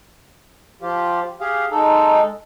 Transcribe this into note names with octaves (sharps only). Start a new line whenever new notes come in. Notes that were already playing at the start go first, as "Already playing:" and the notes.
F3 F4 G4
G4 G#4 F5
G#3 D#4 A4